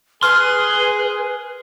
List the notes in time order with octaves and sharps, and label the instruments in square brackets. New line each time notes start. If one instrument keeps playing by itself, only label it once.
[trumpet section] G#4 [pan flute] B4 [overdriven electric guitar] C6 [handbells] F6